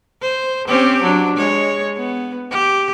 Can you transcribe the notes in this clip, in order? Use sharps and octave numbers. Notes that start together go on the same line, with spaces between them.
C5
C4 C#4 G4
F#3 D4
G#3 C#5
B3
G4